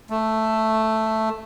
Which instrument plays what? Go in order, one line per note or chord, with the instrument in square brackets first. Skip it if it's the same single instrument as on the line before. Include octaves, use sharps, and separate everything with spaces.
[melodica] A3